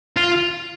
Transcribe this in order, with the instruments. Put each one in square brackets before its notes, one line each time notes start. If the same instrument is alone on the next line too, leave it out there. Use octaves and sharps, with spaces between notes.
[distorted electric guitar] F4